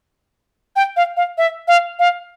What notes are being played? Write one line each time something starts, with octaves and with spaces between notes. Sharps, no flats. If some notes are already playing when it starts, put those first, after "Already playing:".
G5
F5
F5
E5
F5
F5